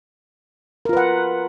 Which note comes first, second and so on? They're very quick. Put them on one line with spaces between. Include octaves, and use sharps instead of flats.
A#4 F4 B4 F#5